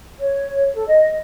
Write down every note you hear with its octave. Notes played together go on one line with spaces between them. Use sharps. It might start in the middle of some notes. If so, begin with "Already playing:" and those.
C#5
A4
D#5